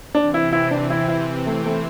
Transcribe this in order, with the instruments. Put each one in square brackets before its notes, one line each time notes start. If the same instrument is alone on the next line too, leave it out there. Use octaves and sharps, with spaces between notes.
[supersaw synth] C3 E3 C4 [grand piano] D4
[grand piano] E4
E4
D4
E4
E4
A3
A3